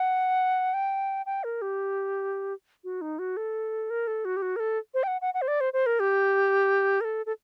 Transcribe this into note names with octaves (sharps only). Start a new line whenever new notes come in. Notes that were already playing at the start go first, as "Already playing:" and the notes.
Already playing: F#5
G5
G5
A#4
G4
F#4
D#4
F#4
A4
A#4
A4
F#4
G4
F#4
A#4
A4
C5
G5
F#5
F#5
F#5
C5
D5
C5
C5
A#4
G4
A#4
A4
A4